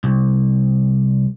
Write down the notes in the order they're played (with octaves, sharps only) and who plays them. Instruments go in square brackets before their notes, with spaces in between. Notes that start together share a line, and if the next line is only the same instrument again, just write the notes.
[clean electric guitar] C2